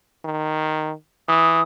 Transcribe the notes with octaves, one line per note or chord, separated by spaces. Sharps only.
D#3
E3 D#6